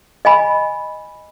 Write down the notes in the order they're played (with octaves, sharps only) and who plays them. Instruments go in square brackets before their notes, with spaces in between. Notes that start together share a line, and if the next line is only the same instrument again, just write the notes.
[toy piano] D#5 G#5 B5